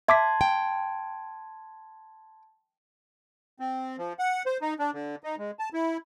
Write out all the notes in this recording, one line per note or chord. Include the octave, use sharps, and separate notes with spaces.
E5 A5 C6 D6 G#6 B6
G5
C4
F3
F#5
C5
D#4
D4
D3
D#4
G#3
A5
E4